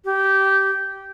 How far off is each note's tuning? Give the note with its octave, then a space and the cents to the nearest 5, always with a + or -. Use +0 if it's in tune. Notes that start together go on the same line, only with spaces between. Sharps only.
G4 -15